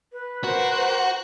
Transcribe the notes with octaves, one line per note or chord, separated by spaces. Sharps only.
B4
F#4 A#4 C5